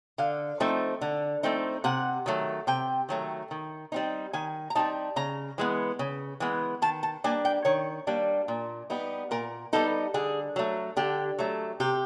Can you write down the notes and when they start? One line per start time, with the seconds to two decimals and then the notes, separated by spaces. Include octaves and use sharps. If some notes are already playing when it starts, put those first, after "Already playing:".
0.18 D3 F5
0.60 F3 A3 C4 D#4
1.01 D3
1.43 F3 A3 C4 D#4
1.84 C3 F#5
2.26 D#3 F#3 A3
2.67 C3 G5
3.09 D#3 F#3 A3
3.51 D#3
3.92 G3 C4 D#4
4.33 D#3 G#5
4.70 A#5
4.75 G3 C4 D#4 A5
5.16 C#3 A#5
5.58 E3 G#3 B3
5.99 C#3
6.40 E3 G#3 B3
6.82 D#3 A5
7.03 A5
7.24 G3 A#3 D4 G#5
7.45 G5
7.65 D#3 C#5
8.07 G3 A#3 D4
8.48 A#2
8.90 G3 B3 D#4
9.31 A#2 A#4
9.73 G3 B3 D#4 A4
10.14 D3 G#4
10.56 F#3 A3
10.97 D3 G4
11.39 F#3 A3
11.80 C3 G4